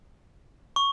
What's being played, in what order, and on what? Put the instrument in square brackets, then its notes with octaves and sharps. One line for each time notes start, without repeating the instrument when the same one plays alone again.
[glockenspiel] C#6